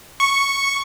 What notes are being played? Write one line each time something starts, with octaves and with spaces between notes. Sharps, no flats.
C#6